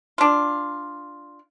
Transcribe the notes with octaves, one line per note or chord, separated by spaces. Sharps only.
D4 F4